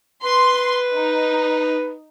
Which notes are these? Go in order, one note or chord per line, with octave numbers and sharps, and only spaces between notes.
B4 C6
D#4